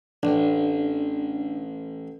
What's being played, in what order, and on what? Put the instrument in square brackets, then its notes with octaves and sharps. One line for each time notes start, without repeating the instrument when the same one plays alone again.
[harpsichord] A1 [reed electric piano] D4